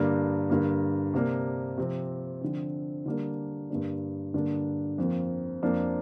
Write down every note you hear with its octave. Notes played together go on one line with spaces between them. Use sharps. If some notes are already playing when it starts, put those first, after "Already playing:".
Already playing: G2 D3 A#3 D4
G2 D3 A#3
C3 A#3 D4
C3 F3 C4
D3 F3 C4
D3 G3 A#3 D4
G2 D3 A#3 D4
G2 D3 A#3 D4
F2 F3 A#3
F2 F3 A#3 D4